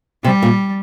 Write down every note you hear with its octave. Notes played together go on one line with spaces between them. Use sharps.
C3 G3
A#2